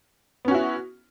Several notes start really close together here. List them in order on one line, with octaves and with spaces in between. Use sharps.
B3 C#4 F#4 E4